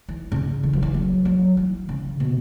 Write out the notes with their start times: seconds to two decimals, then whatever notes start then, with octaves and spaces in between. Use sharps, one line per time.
0.09 E3
0.32 C#3
0.63 E3
0.73 F#3
0.82 E3
0.94 F#3
1.25 F#3
1.57 E3
1.89 C#3
2.20 B2